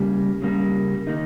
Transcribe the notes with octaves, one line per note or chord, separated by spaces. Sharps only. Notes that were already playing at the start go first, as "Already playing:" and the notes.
Already playing: C#3 G3 A#3
C#3 G3 A#3
D#3 A#3 D#4